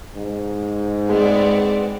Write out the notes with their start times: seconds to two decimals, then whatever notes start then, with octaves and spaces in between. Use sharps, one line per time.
0.15 G#2
1.09 G#3 B3 C4 D5